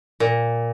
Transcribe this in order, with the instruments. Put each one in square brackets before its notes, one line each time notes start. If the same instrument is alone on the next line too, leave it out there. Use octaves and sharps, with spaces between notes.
[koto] A#2